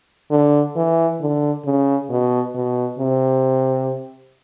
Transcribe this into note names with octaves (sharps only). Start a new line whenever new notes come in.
D3
E3
D3
C#3
B2
B2
C3